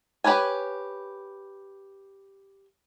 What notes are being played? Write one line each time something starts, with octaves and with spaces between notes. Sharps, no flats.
G4 B4 C#5 G#5